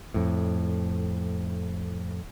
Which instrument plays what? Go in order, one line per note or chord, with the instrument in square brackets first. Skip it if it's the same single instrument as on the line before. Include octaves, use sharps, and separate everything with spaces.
[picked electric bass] F2 A2